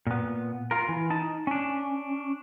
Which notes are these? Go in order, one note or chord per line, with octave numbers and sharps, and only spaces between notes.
A#2 B3
F4 A#4
E3
D#4 A5
C#4 D4